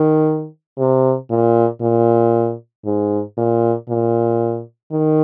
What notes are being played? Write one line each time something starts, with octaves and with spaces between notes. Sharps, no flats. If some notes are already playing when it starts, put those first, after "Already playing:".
Already playing: D#3
C3
A#2
A#2
G#2
A#2
A#2
D#3